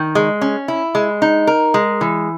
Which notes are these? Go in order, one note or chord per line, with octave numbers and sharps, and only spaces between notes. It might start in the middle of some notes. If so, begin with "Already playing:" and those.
Already playing: D#3
G#3
C#4
E4
G#3
D#4
A#4
G#3
E3